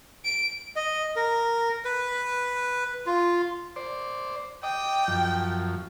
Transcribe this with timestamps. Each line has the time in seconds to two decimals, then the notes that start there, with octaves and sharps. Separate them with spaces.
0.25 D7
0.76 D#5
1.16 A#4
1.85 B4
3.06 F4
3.76 C5 D5
4.63 D#5 G5 D6
5.08 F#2 F3